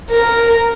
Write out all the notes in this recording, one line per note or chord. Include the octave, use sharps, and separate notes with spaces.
A#4